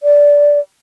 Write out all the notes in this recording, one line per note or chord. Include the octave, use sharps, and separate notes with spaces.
D5